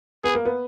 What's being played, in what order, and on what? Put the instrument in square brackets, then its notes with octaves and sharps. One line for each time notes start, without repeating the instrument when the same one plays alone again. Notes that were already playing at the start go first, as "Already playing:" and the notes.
[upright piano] B3 [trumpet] G#4
[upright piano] A#3
B3